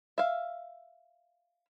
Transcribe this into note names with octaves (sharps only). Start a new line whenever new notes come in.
E5 F5